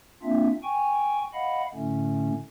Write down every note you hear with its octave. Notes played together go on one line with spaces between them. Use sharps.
A#3 C4 D4 F4 E5
G5 G#5 C#6
D#5 F5 F#5 B5
A2 D3 A3 C#4